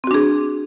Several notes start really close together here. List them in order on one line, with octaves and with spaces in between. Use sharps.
C4 F#4 D4 G#4